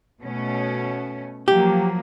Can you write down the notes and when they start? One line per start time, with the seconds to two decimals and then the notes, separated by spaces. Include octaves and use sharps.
0.20 B2 A3 C#4
1.48 F3 F#3 A#3 G4